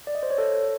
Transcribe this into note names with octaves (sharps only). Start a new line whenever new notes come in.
D5
D#5
C5
C#5
A4